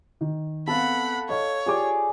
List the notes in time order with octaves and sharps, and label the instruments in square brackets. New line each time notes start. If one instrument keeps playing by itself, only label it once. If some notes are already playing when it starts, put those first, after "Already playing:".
[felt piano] D#3
[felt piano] B3 C4 [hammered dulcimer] A4 F5 [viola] F#5 B5
[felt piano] A4 D#5 F5 [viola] C#5 [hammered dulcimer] C#6
[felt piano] F4 G4 D6 [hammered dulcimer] G#4 D5